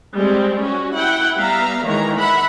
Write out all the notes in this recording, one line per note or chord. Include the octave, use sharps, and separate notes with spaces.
G3 G#3 C4
C#4 F#4
E4 F#5 G5
G3 B3 E5 F5 A#5
D#3 E3 G#3 C#5 A#5
E5 F#5 B5